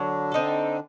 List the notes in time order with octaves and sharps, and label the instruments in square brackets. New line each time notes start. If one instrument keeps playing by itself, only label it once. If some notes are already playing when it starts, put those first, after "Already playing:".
Already playing: [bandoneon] D3 D4 [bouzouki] F#3
[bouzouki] C4 D#4 A4